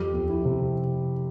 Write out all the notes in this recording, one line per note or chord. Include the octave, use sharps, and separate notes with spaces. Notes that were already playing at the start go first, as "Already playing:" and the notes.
Already playing: F2 G4
F2
E4
C3